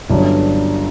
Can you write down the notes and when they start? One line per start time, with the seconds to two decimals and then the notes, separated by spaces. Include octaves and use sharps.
0.10 G1 G2 D3 F#3 C#4